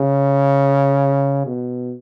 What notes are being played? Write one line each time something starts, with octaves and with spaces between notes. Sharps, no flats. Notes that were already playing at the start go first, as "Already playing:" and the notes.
Already playing: C#3
B2